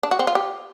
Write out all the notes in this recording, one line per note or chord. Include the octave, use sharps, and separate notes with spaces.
D4
F#4
C4
F4
G4